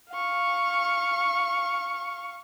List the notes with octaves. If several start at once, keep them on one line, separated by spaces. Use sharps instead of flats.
F5 C#6